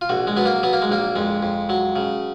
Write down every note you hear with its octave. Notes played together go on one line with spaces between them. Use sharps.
F4
A#1 F#4
G#3
F#3 B3
A#3
F#3 B3
A#3
G#3
A#1 A#3
F2 G#3
F2
F#3
C#3